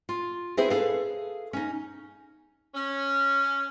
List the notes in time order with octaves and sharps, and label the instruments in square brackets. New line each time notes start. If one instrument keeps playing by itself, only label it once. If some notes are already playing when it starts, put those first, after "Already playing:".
[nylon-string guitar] F4
C4 E4 G#4 B4 C5
G#4 A4 B4 F5
C#4 D#4
[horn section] C#4